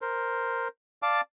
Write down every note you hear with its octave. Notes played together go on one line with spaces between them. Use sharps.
A#4 C5
D5 F5 A5 D6